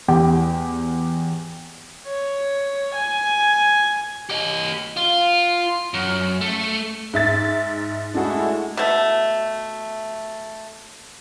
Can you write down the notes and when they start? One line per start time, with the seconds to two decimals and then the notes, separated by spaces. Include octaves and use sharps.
0.08 E2 G4 G5
2.07 C#5
2.95 G#5
4.30 G4 D#5
4.97 F4
5.94 F#2
6.41 A3
7.14 G#2 E5 A6
8.15 G#3 A3 D4 E4 F#4
8.77 B2 A3